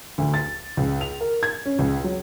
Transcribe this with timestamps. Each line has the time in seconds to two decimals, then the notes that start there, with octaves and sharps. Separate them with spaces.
0.18 D2
0.34 A6
0.77 C#2
1.01 F7
1.21 A#4
1.43 G#6
1.66 C#4
1.79 C#2
2.04 F#3